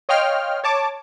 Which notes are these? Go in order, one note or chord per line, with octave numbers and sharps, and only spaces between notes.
C#5 D#5 F5 G5 C6 F6
C#5 A5 D6